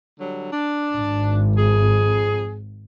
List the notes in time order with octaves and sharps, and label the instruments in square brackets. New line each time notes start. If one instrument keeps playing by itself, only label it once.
[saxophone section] D3 F#3 G3
D4
[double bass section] G#1
[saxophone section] F2 G#4